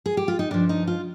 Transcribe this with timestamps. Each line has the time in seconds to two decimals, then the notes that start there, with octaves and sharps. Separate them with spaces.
0.06 G#4
0.17 G4
0.28 F4
0.39 D#4
0.50 G2 F3 D4
0.69 D#4
0.87 F4